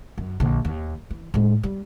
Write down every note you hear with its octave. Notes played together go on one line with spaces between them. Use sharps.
F#2
A#1 D3
D#2
E3
A2 G#3
G3